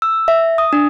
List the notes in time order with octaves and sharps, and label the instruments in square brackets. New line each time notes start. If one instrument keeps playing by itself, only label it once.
[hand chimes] E6
E5
D#6
D4